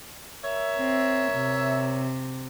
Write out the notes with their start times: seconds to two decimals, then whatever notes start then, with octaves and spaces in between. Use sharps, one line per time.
0.44 A#4 C#5 E5
0.78 C4
1.34 C3